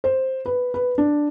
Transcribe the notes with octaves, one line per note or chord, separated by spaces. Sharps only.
C5
B4
B4
D4